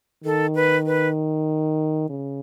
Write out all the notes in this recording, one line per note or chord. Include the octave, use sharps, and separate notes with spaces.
D#3 A4
B4
B4
C#3